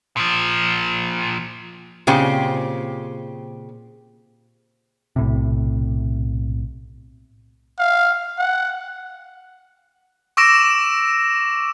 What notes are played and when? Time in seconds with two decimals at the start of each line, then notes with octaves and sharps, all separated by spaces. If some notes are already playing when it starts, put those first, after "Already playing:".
0.17 A#2 F3
2.07 A#2 C#3 C4 G4
5.16 B1 A2 C3
7.79 F5
8.38 F#5
10.37 C#6 D6 E6 A#6 D7 E7